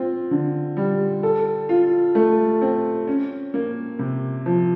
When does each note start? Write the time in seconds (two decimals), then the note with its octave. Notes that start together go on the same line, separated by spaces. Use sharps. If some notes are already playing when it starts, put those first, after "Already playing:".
Already playing: C4 F4
0.31 D3
0.77 G3
1.23 A4
1.69 F4
2.15 A3
2.61 C4
3.07 C#4
3.54 A#3
3.99 C3
4.46 F3